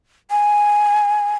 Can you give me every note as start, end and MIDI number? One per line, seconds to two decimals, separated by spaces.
0.31 1.36 80